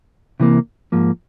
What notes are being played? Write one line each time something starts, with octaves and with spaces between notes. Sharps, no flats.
C3 E3 A#3
G#2 F3 A#3